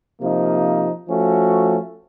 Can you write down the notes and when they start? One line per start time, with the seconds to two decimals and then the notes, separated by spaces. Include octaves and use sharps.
0.20 C3 F3 A#3 D#4
1.08 F3 A3 C#4 F#4